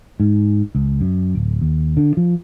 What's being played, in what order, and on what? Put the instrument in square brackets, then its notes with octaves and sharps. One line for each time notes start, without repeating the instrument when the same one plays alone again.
[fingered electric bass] G#2
C#2
F#2
D1
D#2
D3
F3